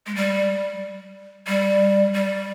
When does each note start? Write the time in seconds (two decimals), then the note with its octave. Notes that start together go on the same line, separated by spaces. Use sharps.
0.07 G#3
0.15 G3
1.47 G3
2.14 G3